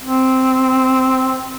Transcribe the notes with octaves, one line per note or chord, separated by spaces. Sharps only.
C4